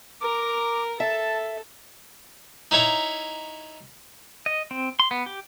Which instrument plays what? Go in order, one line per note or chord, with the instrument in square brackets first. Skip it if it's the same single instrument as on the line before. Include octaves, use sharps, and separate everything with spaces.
[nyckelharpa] A#4 A#5 [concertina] D6
[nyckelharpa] A4 [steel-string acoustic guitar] E5 [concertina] A5
[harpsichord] D#4 E4 C#5 E5 A#5
[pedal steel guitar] D#5
C4
C6
B3
G4